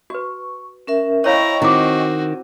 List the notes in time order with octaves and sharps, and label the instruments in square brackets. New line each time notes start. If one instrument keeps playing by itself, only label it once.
[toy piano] F#4 B4 [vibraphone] C#6
[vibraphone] C#4 A#4 E5
[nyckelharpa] E4 A#5 [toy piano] C5 C#5 F5 [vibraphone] D#5 G5 C#6
[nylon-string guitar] D#3 [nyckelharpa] C4 F#4 [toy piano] E4 D6